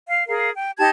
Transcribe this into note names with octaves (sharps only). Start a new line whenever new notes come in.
F5
G#4 A#4 F5
G5
D#4 G4 A5 G#6